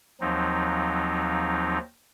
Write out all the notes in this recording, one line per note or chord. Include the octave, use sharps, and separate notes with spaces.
D#2 F3 F#3 C4 D#4